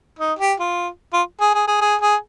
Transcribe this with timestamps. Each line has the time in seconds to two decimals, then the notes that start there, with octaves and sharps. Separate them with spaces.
0.19 D#4
0.39 G4
0.60 F4
1.13 F4
1.40 G#4
1.54 G#4
1.67 G#4
1.81 G#4
2.01 G#4